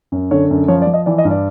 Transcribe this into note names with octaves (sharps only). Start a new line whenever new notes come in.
F#2
D3 C#5
F#2
F3 C#5
D5
F3
D#5
E3 D5
D#5
G2
D5